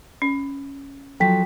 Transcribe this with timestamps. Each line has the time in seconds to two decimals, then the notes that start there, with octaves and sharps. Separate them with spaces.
0.22 C#4
1.20 F3 F#3 A4 G5 B6